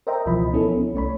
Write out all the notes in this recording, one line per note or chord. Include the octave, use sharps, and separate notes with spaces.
A#4 C5 D#5 E5 G5 A#5
C#2 B2 E3 F3 D#5 B5
B3 C#4 E4 A4
C#4
C2 A3 C#5 B5